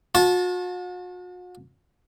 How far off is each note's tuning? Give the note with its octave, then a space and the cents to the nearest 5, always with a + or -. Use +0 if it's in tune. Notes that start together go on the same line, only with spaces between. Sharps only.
F#4 -45 A5 -15